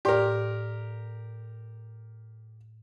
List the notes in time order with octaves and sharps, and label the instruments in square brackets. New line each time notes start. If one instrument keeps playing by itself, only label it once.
[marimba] A2 D5 [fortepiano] G4 A#4